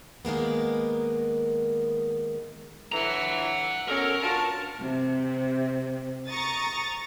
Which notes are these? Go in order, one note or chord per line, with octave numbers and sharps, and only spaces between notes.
D#3 G#3 A#3 B3
D3 E3 F#5 A#5
B2 C#4 A4 A#4
D4 F4 F#4 A5
C3
A#5 C#6 D#6 A6